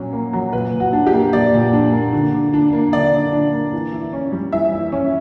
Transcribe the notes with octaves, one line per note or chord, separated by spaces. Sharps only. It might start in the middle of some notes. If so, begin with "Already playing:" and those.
Already playing: A#2 F#3 C#4
A#3
F#3
A#2 B4
A#2
F#4
D4
G4
A#3
A#2 D5
A#2
D4
A#3
D3
D3
D4
A#3
D3 D5
D3
D4
A#3
E3
E4
C#4
G3
E3 E5
E4
C#4